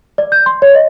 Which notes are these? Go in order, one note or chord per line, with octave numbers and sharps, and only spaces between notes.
D5
G6
C6
C#5
D#5